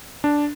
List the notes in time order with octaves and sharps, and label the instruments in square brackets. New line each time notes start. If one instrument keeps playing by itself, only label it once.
[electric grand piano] D4